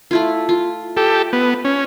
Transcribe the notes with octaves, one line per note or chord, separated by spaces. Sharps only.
A3 E4 F4
F4
G4 A4
B3
C#4